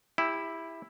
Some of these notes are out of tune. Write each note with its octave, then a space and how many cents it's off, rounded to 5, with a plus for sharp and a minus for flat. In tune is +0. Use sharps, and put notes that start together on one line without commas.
E4 +0 G4 +30